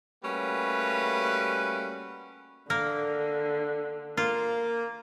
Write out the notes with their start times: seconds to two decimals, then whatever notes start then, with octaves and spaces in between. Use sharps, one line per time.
0.24 G3 A3 A#3 C#4 F#4 B4
2.70 D3 A#3 A#4
4.17 A#3 F4